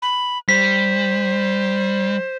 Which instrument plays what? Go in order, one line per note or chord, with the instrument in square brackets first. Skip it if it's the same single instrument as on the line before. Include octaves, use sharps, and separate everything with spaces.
[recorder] B5
[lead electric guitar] G3 [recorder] C5 [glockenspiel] B6